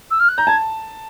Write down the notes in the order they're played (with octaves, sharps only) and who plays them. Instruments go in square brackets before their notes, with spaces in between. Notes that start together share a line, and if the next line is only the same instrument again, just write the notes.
[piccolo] E6
F6
F#6
[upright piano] A#5 [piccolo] G6
[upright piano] A5 [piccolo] G#6